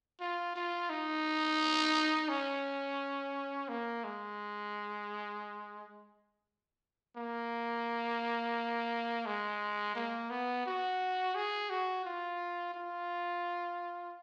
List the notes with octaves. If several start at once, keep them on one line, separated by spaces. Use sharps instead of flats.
F4
F4
D#4
C#4
A#3
G#3
A#3
G#3
A#3
B3
F#4
G#4
F#4
F4
F4